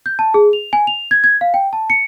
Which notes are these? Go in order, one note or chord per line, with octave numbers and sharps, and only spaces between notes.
G6
A5
G#4
F7
G#5
F7
G#6
G#6
F5
G5
A5
C#7